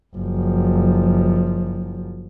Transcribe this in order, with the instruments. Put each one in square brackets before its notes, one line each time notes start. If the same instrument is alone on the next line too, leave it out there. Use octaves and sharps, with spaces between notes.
[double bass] F#1 F3